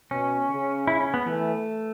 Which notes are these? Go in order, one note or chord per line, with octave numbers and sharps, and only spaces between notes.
B2 C#4
C#3
E4
C#4
B3
E3 A3